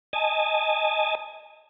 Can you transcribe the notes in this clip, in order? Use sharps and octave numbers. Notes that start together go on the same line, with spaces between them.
D#5 G#5 A5